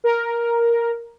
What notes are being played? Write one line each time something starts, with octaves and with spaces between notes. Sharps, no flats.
A#4